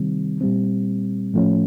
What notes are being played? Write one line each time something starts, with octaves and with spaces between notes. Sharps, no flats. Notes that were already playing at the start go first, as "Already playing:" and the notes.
Already playing: C3 D#3 G3 C4
A#2 G3 C4
A2 F3 A3 C#4